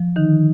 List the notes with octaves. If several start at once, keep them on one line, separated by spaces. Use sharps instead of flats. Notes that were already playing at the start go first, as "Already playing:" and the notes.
Already playing: F3
D3 D#3 D#4